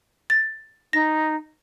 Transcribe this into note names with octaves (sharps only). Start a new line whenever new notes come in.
A6
D#4 A#6